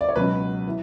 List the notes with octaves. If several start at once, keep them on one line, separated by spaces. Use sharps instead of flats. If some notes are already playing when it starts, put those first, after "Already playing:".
D5
C#5
C#2 B2 F#3 C#4 B4
E3